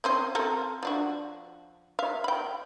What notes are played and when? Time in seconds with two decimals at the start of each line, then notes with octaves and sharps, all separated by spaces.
0.04 C4 C#4 C5
0.35 C4 A4 A#4
0.83 F3 D4 F#4
1.99 E5 F5
2.24 G5 B5